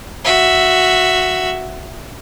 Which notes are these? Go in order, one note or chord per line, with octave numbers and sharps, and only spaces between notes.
F#4 E5